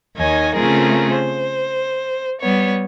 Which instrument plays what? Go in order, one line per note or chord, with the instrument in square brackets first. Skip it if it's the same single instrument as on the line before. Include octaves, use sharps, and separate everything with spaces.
[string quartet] D#2 D#3 C#5 D#5 G#5
C#3 A3 C4 F4 G#4 A#4
C5
G3 B3 C#5